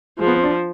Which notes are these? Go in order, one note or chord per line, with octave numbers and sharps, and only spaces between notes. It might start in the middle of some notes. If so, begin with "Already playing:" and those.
F3 G#3
B3
C4
D4